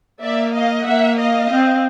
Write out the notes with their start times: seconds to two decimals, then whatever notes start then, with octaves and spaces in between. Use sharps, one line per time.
0.22 A#3 D5 E5
0.54 D#5 F5
0.86 A#3 E5 F#5
1.18 D#5 F5
1.51 C4